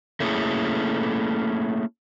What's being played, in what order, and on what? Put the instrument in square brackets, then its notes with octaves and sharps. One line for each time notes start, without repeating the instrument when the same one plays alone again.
[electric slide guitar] A3 A#3 C#4 E4 G#4 A4